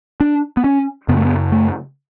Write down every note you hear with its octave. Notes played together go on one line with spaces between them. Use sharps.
D4
B3
C#4
F#2 C#3 B3
A3
B3
A3